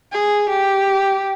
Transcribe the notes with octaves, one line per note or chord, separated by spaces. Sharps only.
G#4
G4